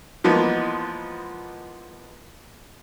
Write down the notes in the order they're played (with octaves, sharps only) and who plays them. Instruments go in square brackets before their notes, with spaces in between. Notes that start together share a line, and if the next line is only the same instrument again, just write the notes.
[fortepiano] E3 F3 G#3 A#3 B3 D#4